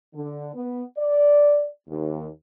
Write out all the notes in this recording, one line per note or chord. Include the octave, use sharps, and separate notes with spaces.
D3
B3
D5
D#2